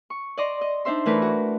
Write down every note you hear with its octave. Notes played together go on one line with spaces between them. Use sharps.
C#6
D5 D#5 A#5 C6
D#5
D4 D#4 C5 E5 C6
E3 A3 A#4 B4
F#4